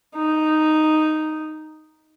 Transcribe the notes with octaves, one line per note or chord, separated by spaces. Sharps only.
D#4